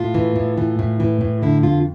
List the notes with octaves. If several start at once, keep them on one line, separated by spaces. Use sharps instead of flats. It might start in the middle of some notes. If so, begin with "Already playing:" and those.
Already playing: A2 F4
E3
A2
E3
A2
E3
A2
D3 E4
F2 F4